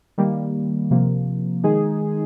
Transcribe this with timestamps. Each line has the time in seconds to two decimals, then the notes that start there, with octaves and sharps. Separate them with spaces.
0.18 D#3 G3 A#3
0.91 C3 F3 A#3
1.63 D#3 G#3 D#4 G#4